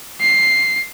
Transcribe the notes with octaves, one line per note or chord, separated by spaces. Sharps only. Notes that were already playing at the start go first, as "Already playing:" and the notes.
C7